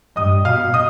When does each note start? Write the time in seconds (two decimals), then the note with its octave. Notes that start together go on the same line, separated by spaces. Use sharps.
0.16 G2 D#5 D#6
0.45 B2 F5 F6
0.74 D#5 D#6